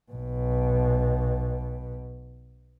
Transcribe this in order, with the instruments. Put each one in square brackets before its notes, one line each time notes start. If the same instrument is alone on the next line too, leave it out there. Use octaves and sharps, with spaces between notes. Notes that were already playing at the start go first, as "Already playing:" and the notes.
[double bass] B1 B2